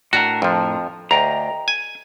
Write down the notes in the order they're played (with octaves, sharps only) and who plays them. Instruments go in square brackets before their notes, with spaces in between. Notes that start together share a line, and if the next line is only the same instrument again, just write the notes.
[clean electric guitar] A2 D4 A#4 [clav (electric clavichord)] F#4
[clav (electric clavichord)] F2 F3
[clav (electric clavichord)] D2 [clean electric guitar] D#5 G5 A#5
[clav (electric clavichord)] G#5